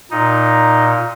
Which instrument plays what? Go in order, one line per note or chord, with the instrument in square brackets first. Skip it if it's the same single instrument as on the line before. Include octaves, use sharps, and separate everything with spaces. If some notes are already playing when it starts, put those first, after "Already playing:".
[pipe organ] A#2 D#4